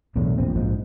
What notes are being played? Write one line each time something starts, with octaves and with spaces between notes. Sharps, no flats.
B1 E2 A2 D3
E1 A#1 C4
A#1 G#2 F3